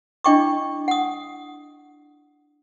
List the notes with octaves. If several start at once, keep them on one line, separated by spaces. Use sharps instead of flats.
D4 E4 D#5 G5 C#6 D6
F#5 D#6